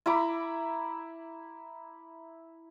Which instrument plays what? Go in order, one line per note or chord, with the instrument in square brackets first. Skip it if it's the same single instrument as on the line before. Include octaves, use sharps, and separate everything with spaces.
[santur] E4 A#5 B5 D6